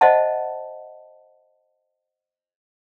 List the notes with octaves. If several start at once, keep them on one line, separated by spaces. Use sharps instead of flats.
C5 D#5 E5 F#5 A5